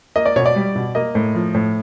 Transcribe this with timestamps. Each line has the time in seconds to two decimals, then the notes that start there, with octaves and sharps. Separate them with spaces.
0.16 A#3 D#5
0.26 D5
0.36 B2 C#5
0.46 D5
0.56 G3
0.75 B2
0.95 A#3 D#5
1.15 A2
1.35 F3
1.55 A2